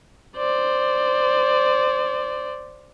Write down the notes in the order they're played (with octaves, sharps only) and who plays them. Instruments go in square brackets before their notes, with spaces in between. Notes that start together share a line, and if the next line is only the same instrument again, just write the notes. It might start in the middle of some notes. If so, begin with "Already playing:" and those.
[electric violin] C5 D5